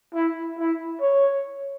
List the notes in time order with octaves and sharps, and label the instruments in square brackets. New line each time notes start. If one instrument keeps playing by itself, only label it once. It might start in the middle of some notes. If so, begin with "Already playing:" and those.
[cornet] E4
E4
C#5